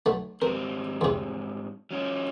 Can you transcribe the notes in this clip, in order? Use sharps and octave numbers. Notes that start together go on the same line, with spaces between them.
B1 A3
G#2 G3 C4 A#4
E2 C3
F#3 C#4 F4